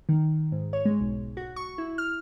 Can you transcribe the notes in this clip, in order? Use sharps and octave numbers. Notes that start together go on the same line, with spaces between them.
D#3
G#2
C#5
G#3
B1
F#4
C#6
E4
F6